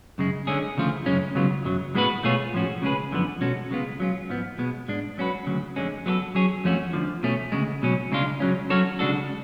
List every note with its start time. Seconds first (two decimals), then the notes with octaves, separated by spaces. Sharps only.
0.18 F#2 C#3 G#3
0.47 D3 G#3 C#4 G#4
0.77 D2 C#3 F3 A3 F4
1.06 F#2 C#3 G#3 C#4
1.35 C#2 C#3 F#3 B3 F4
1.65 F#2 C#3 F#3
1.95 A2 G#3 B3 F#4 B4
2.23 B2 A3 F4 G#4 C#5
2.53 A2 F3 G#3 C#4 F#4
2.82 C#3 G#3 C#4 G#4 B4
3.12 F#2 D3 F3 B3
3.41 B2 G#3 C#4 F#4 A4
3.71 C#3 G#3 B3 F4
4.00 F#3 C#4 F4
4.29 G#2 F3 B3
4.58 B2 G#3 B3
4.88 G#2 G#3 D4
5.18 F#3 C#4 F#4 B4
5.46 D2 C#3 F#3
5.76 F2 D3 G#3 C#4
6.06 F#3 B3 F#4 A4
6.35 F#3 C#4 G#4 C#5
6.64 F2 F3 A3 C#4 F#4
6.93 D2 D3 F3
7.23 B2 A3 C#4
7.52 D2 C#3 G#3
7.82 B2 F#3 C#4
8.11 C#2 C#3 G#3 D4 F4
8.40 C#2 C#3 F#3 C#4
8.70 F#3 C#4 F#4 A4 C#5
8.99 C#3 G#3 D4 F#4 A4